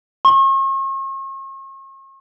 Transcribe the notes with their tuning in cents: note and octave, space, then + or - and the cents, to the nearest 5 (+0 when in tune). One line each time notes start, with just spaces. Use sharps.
C#6 -45